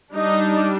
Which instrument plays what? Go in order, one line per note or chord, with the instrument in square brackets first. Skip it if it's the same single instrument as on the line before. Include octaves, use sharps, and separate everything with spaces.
[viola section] G3 D4 D#4